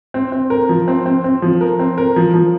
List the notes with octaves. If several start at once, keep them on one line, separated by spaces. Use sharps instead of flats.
C4
C4
A#4
F3
C4
C4
C4
F3
A#4
C4
A#4
F3
F3